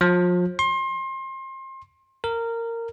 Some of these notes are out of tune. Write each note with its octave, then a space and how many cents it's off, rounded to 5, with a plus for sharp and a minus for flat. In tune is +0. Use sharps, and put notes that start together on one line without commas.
F3 +35
C6 +30
A#4 -15